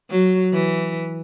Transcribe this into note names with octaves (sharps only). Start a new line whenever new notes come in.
F#3
E3